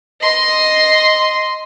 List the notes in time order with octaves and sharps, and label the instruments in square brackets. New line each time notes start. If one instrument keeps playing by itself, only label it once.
[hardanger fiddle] D#5 C6